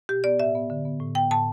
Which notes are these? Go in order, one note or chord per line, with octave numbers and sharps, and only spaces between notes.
B2 G4
B3 D5
A2 E5
B3
D3
B3
A2
B3 G5
A2 A5